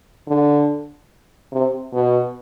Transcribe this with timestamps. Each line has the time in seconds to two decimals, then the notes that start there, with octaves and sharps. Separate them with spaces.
0.27 D3
1.52 C3
1.93 B2